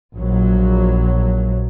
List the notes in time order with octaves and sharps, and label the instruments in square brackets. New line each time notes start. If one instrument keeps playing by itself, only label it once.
[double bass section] A#1 F#3